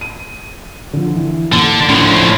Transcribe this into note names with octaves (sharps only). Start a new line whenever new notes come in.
D#7
D3 F3
E3
D#2 D3
A2 F3 D4